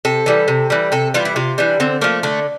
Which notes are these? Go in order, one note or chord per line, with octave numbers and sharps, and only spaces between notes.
C3 A4
E3 G3
C3
E3 G3
C3 A4
E3 G3 F4
E4
C3 F4
E3 G3 D4
D3 C4
F3 A3 A#3
D3 A3